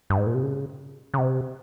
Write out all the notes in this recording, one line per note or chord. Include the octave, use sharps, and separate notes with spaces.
G2
G#2
A#2
C3
C#3
C#3
C3